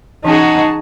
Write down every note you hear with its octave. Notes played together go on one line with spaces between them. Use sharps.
E3 C#4 D#4 F#4 G#4 A5